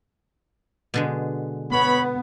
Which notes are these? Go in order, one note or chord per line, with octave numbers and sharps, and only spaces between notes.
B2 D3 G#3
B3 C#5 B5